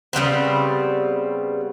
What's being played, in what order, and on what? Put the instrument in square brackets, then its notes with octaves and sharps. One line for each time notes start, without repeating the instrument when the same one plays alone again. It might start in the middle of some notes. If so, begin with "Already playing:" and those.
[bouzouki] C#3 G3 B3 C4